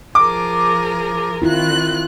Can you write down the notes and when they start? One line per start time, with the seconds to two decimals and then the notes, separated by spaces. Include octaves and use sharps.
0.15 F3 G#4 A#4 D6
1.42 D#3 C4 E4 F4 F#6